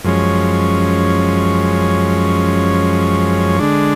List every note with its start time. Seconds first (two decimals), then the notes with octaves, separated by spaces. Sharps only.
0.04 F#2 F3 G#3 C#4
3.59 D3 G#3 D4